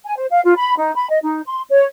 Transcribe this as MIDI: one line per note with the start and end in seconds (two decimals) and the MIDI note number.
0.05 0.13 80
0.17 0.26 72
0.30 0.41 77
0.44 0.54 65
0.57 0.75 83
0.77 0.93 63
0.95 1.09 83
1.09 1.18 75
1.22 1.41 63
1.46 1.61 84
1.70 1.84 73